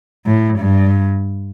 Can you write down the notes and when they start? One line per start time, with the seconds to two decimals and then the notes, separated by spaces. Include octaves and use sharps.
0.26 A2
0.59 G2